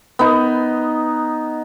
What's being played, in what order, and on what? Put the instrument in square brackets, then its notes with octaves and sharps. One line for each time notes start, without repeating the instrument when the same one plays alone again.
[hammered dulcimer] B3 D#4